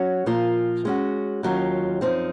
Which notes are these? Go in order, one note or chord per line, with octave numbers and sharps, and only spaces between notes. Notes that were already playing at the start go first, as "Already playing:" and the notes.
Already playing: F#3 C#4 F#4 C#5
A#2 F3 A#3 F4
G#3 C#4 F#4
D#2 D#3 F#3 C#4 F4
F#2 F3 C4 D#4